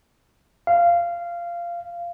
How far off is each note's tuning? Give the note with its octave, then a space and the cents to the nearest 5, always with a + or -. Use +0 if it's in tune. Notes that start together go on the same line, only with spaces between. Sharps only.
F5 -15